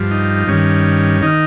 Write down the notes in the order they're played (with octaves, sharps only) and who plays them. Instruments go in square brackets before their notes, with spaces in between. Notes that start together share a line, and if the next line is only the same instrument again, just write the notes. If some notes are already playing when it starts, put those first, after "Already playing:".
Already playing: [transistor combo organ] G2 F3
D#4
G2 D#3 C#4
D#3 D#4